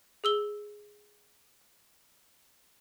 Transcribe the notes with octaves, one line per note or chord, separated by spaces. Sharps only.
G#4 E6 G7